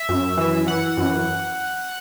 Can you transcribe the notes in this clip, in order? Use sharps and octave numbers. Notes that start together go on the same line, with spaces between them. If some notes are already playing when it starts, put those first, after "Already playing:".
Already playing: E5
F#2
E3
E3 F#5
F#2